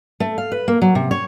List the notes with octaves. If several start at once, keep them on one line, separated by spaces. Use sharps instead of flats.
A3
F5
B4
A#3
F#3
C3
C#5